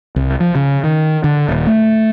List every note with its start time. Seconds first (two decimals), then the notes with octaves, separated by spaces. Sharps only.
0.16 C2
0.40 F3
0.55 C#3
0.84 D#3
1.24 D3
1.48 D#1
1.67 A3